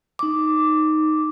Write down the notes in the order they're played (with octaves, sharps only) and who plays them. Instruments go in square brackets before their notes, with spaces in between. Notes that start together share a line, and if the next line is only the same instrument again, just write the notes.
[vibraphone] D#4 D6